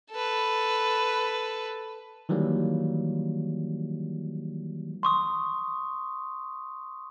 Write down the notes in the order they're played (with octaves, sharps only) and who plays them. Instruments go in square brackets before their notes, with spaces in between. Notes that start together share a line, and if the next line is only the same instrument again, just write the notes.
[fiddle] A4 B4
[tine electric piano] D#3 E3 F#3 G3 A#3
[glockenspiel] C6 C#6 D#6